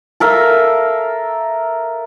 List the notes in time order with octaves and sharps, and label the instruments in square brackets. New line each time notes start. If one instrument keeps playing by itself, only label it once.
[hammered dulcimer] A4 A#4 E5 F5